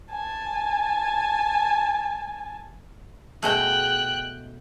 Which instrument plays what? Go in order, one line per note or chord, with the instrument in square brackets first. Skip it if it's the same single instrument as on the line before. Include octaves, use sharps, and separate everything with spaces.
[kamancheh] G#5 A5
[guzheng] B2 G#3 A3 [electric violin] G5 F#6